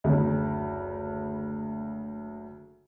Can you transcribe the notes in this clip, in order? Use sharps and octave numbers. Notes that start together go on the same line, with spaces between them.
F#1 D2